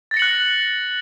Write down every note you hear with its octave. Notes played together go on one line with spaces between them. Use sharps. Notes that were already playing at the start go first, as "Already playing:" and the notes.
F#6 A6 A#6 C#7 F#7